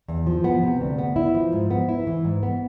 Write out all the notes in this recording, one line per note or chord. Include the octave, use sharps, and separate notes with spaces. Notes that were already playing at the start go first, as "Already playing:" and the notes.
E2
F3
B3
C3
D2
B3
E4
F3
G#2
B3
E4
E3
G#2
B3